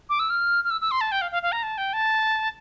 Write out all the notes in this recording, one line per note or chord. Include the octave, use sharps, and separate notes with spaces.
D6
E6
F6
F6
E6
E6
C6
A5
G5
F5
F5
F5
A#5
A5
G5
A5